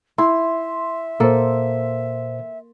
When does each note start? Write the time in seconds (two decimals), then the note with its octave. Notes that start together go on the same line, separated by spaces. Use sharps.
0.18 E4 E5 C6
1.20 A#2 A#3 A4 C5